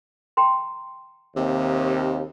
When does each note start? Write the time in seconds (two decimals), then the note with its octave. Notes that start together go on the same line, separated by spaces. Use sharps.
0.37 G5 A#5 C6
1.36 D#2 C3